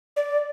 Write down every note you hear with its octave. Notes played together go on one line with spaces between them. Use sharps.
D5